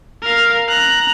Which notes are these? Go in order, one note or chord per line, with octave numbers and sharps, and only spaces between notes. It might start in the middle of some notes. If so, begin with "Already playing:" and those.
A#4 F5
A#5 F#6